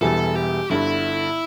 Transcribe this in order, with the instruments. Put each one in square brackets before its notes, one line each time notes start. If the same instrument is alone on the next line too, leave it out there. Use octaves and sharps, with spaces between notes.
[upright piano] E1 E2 E3 G3 E4 [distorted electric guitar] A4
[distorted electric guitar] G4
[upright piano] G1 G2 D3 [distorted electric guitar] E4